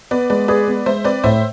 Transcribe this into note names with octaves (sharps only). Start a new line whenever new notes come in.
B3 B4 D5
G#3 B4 D5
G#4 B4 D5
B3
G#3 C5 E5
C4 B4 D5
A2 C5 E5